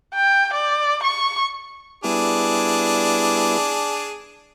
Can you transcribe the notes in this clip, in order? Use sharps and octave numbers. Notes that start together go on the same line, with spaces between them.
G5
D5
C#6
G3 B3 D4 E4 G#4